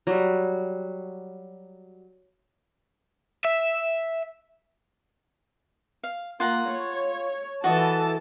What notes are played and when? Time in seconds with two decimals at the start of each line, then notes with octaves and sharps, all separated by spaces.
0.07 F#3 G3
3.45 E5
6.03 F5
6.40 A#3 F4 F#5 A#5
6.72 C#5
7.64 E3 F#4 A4 D#5 A5